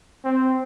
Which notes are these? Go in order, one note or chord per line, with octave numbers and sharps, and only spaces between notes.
C4